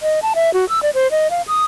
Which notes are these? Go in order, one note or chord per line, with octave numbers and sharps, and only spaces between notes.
D#5
A5
E5
F#4
E6
D5
C5
D#5
F5
D#6